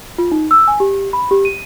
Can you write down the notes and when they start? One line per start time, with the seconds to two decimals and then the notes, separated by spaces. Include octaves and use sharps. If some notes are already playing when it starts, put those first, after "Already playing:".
0.18 F4
0.32 D#4
0.51 E6
0.68 G#5
0.80 G4
1.13 B5
1.31 G4
1.45 D#7